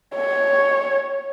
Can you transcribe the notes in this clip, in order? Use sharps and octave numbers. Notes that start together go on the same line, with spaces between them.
C#5